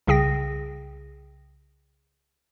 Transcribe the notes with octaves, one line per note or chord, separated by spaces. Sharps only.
C2 C#3 G#4 G5 A#6